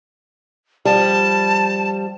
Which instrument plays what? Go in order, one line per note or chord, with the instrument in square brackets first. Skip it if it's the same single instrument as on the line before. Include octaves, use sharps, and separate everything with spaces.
[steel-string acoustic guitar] F3 G3 [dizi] A5